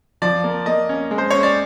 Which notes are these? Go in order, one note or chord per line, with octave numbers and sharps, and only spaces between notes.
F3 D5
A#3
A#3 D#5
C#4
G#3
C5
C#4 C#5
D5